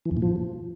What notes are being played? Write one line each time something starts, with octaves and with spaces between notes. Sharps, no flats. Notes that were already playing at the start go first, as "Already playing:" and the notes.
E3
F2
A#2
F3